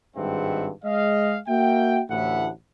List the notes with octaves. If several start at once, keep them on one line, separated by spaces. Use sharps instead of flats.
G#1 G2 G#3 C4 E5 F#5
G#3 D#5 F5
A#3 F#4 E5 G5
A1 D2 A2 E5 F#5